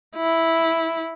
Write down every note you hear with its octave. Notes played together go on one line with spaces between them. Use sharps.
E4